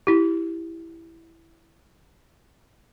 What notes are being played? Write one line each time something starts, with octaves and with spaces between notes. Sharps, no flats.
E4 G4